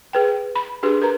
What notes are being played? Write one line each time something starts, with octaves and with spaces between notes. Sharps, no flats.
G#4 B4 G5
B5
D4 G4 G#4 B4
A#4 B4 A#5